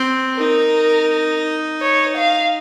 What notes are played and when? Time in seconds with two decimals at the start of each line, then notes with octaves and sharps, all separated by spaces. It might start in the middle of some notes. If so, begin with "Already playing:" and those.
Already playing: C4
0.36 D#4 A#4
1.81 C#5
2.17 F5